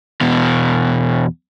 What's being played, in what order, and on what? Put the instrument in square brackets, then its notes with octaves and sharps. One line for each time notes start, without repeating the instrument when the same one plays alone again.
[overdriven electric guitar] E2 B2